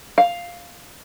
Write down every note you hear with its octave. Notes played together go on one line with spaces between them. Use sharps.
F5